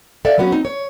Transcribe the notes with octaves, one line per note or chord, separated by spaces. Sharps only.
A4 D5 E5 F5
F#3 A#3 B3 C#4 F#4
C4 D#4
C#5